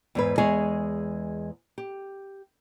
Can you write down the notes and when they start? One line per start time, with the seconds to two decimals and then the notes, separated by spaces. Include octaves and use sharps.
0.15 E2 G#2 B4
0.38 E2 G#3 G#4 C#5 D#5 G#5
1.78 G4